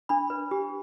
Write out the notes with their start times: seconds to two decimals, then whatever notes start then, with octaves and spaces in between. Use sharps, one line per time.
0.09 D4 B5
0.30 B4
0.51 G4